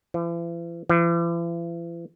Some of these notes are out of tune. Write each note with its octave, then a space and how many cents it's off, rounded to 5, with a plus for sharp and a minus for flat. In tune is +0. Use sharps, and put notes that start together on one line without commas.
E3 +45
E3 +45